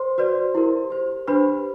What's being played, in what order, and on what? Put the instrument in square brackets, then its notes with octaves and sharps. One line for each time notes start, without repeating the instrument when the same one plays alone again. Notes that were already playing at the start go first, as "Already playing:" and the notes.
Already playing: [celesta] C5 C6
F#4 B4 D5
E4 G4 A#4
G4 C5
D4 G4 B4 C5 B5